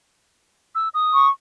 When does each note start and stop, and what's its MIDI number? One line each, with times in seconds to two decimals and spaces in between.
0.75 0.89 88
0.94 1.26 87
1.14 1.30 85